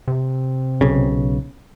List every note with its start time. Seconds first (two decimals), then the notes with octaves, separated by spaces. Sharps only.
0.08 C3
0.81 B1 C#3